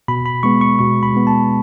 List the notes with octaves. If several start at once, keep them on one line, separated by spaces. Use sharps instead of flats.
B2 B5
B5
G#3 B3 C#6
C#6
B2 C#6
B5
G#3 B3
A5